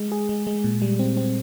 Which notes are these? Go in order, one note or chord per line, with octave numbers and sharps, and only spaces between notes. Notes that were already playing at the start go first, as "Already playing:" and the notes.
Already playing: G#3
G#4
G#3
G#3
A#2
G3
C4
C4